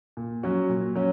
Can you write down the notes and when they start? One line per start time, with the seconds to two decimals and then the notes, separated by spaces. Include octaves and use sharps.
0.17 A#2
0.43 F#3 C#4 F#4
0.69 A#2
0.95 F#3 C#4